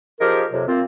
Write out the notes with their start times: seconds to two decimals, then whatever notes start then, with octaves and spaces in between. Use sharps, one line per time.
0.20 F3 D#4 G4 G#4 A#4
0.52 F2 C3 F#3
0.68 A#3 C4 F4